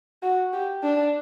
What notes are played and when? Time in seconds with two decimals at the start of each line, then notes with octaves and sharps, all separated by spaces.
0.23 F#4
0.53 G4
0.83 D4